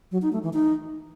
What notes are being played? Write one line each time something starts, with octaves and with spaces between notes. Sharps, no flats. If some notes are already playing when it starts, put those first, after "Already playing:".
F#3
D#4
A3
E3
D#4